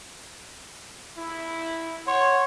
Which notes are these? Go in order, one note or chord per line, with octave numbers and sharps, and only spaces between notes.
E4
C#5 F#5 C6